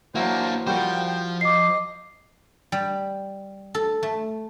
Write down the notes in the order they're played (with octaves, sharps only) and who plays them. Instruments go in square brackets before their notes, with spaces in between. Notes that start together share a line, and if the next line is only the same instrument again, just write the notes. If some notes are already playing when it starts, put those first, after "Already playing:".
[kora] E3 F#3 E4 [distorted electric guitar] A#3 D4 [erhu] C5
[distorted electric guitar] F3 C5 [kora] G3 F#4 A#4 [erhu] G5
[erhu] D#5 [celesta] D6 C7
[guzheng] G3
A4
A3